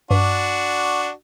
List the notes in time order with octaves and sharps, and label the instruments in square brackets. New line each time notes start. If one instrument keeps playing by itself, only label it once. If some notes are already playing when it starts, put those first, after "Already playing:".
[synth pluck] G2 [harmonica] D4 F#4